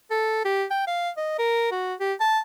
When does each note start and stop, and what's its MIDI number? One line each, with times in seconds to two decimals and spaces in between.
0.11 0.40 69
0.45 0.65 67
0.70 0.86 79
0.87 1.10 77
1.17 1.36 75
1.39 1.70 70
1.72 1.94 66
2.00 2.13 67
2.20 2.39 81